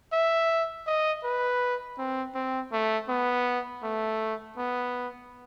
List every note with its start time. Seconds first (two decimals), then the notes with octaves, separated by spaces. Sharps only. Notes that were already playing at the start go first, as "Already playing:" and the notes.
0.13 E5
0.86 D#5
1.24 B4
1.98 C4
2.35 C4
2.72 A3
3.09 B3
3.83 A3
4.57 B3